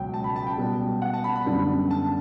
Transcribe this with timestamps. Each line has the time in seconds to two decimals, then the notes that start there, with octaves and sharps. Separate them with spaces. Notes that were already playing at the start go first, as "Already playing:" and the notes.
Already playing: C#2 B2 F#3 G5
0.14 A5
0.24 B5
0.36 A5
0.46 G5
0.58 B2 G3 B3
1.02 F#5
1.14 A5
1.24 B5
1.36 B5
1.46 F#2 D3 G3 B3
1.91 A5